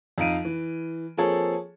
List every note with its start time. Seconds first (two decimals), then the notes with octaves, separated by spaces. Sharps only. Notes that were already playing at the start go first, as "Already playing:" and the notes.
0.18 F2 D#4 F5 D7 D#7
0.45 E3
1.17 F3 A#3 C4 G#4 A4 C#5